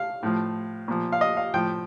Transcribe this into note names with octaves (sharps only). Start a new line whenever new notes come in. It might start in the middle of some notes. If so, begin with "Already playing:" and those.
Already playing: F5
A2 F3
A#2 F3
F5
D#5
F5
A2 F3 G5